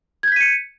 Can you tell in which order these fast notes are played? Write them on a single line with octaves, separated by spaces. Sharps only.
G#6 G6 B6 D#7 C#7